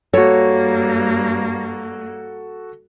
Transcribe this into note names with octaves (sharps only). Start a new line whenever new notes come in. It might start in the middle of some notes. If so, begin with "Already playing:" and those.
G2 A#3 F#4 A4 C#5